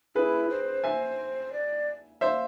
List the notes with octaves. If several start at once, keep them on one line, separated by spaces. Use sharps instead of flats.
E4 G#4 B4
C5
E5 G#5
D5
C5 E5 F5